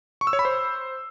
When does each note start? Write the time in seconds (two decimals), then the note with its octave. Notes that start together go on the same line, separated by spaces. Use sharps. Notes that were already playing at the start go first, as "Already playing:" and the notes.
0.21 C#6
0.27 E6
0.33 C#5
0.39 B5
0.45 C5